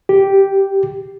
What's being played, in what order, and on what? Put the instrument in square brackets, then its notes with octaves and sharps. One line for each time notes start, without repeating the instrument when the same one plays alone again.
[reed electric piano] G4